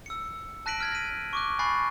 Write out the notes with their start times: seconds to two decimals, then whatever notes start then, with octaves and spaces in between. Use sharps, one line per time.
0.06 E6 C#7
0.66 A5 F#6 A#6 B6 D7 F#7
0.80 F6 G#6 B6
0.92 A#6 D#7
1.33 C#6 D6 F#6
1.59 G#5 B5 C#6 F#6 A6 C7